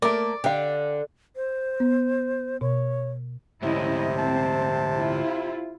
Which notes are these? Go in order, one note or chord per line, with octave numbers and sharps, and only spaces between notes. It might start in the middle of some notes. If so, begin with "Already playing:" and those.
A3 A#3 A#4 D5
D3 G4 F5
C5
B3
B2 C#5
D2 G#2 C3 C#4 E4 D#5
C4 A5
E4 F4